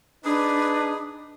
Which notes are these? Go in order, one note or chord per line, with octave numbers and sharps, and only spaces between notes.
D4 D#4 G#4 B4